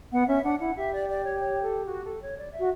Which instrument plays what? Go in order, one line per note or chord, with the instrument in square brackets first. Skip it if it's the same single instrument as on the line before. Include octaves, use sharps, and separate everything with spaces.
[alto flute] B3 [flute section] F#5
[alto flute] C#4 [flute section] E5
[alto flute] D4 [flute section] F#5
[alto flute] E4 [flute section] F#5
[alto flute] G4 [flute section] E5
[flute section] D5
D5
C#5
C#5
A4
F#4
A4
C#5
D5
E5
[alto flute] F#4